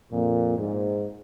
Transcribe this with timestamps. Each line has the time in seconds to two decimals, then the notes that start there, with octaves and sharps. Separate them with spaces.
0.12 F2 A#2
0.59 G#2